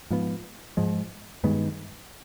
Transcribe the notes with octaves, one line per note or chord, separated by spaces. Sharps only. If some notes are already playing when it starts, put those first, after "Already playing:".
G#2 F3 B3
G#2 F3 G#3
G2 D#3 G#3 B3